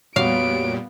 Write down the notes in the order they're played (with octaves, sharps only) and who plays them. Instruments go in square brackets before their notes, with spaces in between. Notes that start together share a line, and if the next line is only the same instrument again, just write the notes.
[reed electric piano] F2 F#4 C#5 [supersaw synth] A#2 G3 [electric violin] B3 D7 [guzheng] F5